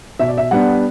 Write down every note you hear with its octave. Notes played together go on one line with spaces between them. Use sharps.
B2 E5
D5
E5
G3 B3 D4 F#5